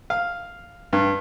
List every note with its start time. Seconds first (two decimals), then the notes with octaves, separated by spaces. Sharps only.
0.10 F5
0.93 G2